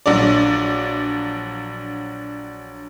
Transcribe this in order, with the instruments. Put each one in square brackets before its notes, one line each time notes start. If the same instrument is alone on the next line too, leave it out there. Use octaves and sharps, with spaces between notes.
[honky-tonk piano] A#1 F#3 D4 D5